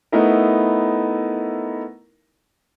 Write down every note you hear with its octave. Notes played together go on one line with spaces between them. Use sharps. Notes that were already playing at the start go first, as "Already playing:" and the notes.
A3 B3 D#4 E4 A#4